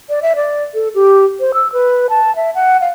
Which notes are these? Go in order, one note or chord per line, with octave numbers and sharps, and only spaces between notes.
D5
E5
D5
A4
G4
C5
E6
B4
A5
E5
F#5
F5